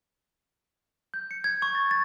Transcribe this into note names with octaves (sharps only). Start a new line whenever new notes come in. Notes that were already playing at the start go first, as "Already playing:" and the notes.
G6
C#7
G#6
C#6
A6
A6